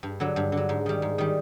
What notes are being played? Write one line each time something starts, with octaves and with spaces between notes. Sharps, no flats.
G2
D3 F#3
G2
D3 F#3
G#2
D#3 G3
G#2
D#3 G3